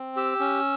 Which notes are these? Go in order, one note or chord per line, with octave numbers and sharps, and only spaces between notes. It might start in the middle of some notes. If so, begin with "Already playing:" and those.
Already playing: C4
G4 E6
C#4